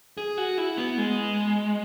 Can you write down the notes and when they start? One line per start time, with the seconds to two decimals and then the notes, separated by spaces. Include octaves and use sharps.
0.18 G#4
0.38 F#4
0.58 E4
0.77 B3
0.98 G#3